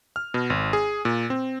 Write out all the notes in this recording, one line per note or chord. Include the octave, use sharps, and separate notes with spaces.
F6
B2
G#1
G#4
A#2
C4